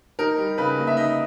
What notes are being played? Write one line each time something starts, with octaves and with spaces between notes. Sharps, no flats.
D#4 A#4
G3
C#3 B4
A#3
E5
D#4 D#5